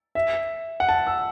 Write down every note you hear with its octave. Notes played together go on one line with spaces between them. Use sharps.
E5
F#5
A5
E6